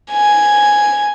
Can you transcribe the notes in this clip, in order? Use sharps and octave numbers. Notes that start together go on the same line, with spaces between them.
G#5